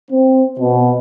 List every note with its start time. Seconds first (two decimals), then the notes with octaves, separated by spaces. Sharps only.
0.11 C4
0.60 B2